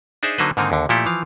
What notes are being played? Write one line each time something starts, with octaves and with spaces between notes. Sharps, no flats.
D4 D#4 G#4 C5 E5
D3 F#3 A#3 D#4 B4 C5
G#2 D3 D#3 A#3 C4 D#4
D#2 D3
A#2 F3 A3 E4 G4 A4
E3 F3 F5